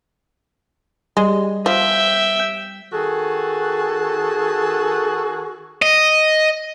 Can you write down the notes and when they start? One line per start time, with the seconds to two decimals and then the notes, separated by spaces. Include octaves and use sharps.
1.17 G3 G#3
1.66 F3 E5 G5
2.93 D#3 F#4 G#4 A4
5.82 D#5